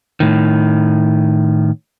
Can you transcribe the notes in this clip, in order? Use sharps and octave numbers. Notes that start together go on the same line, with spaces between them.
A2 D#3